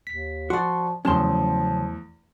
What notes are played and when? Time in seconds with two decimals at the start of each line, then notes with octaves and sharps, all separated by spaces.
0.07 D#2 B6
0.50 F3 F#4 D5 C6 C#6
1.05 E2 C#3 F3 F#3 A3 C#4 A5 C6